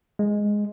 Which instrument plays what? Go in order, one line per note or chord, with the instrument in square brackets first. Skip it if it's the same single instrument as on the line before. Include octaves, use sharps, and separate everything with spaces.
[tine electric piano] G#3